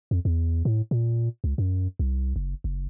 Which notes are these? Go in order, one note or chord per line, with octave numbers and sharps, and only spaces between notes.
F2
E2
A2
A#2
C#2
F#2
C2
F#1
F#1